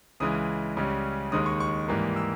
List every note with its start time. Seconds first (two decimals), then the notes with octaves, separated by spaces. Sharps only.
0.20 C#2 C#3 E3 G#3 D#6
0.77 C#2 C#3 G3 C#4
1.32 D#2 D#3 G#3 D#4 D#6
1.46 C#6
1.60 C#6
1.88 G#2 E3 G3 A#3
2.16 E6